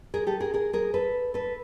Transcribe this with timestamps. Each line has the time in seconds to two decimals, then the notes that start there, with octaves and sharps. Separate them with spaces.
0.14 G#4 A#4
0.27 G4 A4
0.40 G#4 A#4
0.54 G#4 A#4
0.73 G#4 A#4
0.94 A4 B4
1.34 A4 B4